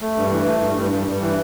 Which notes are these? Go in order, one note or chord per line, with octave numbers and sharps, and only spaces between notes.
A3
G2
E3
A3
G2
G2
G2
G2
E3